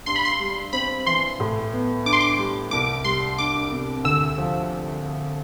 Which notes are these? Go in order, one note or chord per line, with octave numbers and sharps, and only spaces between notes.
G2 C6
B5
C6
G3
C4 B5
E3 C6
A2
B3
D4 D6
C6
D6
G3
C2 D6
G3 C6
D4 D6
C3
D2 E6
F3